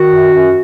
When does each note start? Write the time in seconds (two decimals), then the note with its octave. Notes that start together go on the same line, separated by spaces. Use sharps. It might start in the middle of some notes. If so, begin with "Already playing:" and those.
Already playing: D#3 F#4
0.10 F#2
0.31 F#2